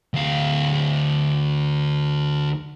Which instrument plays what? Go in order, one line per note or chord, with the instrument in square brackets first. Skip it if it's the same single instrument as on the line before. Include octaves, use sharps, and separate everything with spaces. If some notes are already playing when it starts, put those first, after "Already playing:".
[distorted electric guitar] D2 F5